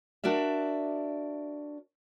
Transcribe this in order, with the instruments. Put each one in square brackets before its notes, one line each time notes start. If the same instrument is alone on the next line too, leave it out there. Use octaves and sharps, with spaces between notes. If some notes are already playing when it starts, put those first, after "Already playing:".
[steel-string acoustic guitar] D4 F#4 A#4 D5 E5